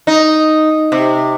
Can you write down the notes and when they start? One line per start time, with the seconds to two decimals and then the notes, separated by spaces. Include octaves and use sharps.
0.07 D#4
0.92 C3